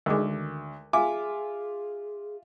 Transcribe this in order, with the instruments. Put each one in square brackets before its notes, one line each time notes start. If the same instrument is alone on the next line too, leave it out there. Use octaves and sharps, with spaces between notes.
[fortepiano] D2 [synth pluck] D#3 G#3 [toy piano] A#4 D6
[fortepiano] F4 E5 D6 [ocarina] G#4 [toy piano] G#5